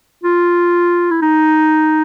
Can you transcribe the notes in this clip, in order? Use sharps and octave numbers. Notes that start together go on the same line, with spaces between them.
F4
E4
D#4